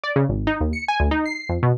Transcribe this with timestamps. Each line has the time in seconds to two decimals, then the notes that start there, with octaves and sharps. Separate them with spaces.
0.04 D5
0.16 C#3
0.29 G#1
0.47 D#4
0.61 D#2
0.73 C#7
0.88 G#5
1.00 D2
1.11 D#4
1.26 C7
1.49 F2
1.63 B2